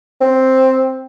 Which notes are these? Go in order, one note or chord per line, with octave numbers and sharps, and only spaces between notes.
C4